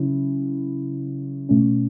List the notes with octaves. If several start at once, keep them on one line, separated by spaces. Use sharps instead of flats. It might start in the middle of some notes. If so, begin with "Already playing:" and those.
Already playing: C#3 F#3 C#4 E4
B2 A3 C#4